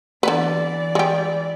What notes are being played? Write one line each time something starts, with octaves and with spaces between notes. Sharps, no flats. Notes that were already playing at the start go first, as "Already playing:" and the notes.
D3 E3 B3 B4 D5
G#3 G4